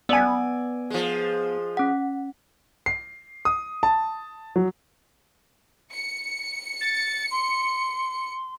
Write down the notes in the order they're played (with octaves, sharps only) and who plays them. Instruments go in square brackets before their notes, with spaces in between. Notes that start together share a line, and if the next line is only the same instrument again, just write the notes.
[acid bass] B3 [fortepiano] D5 G#5 [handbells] E6
[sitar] F3 G#3
[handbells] C#4 F#5
[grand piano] C7
D#6
A5
F#3
[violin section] C#7
[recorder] A6
C6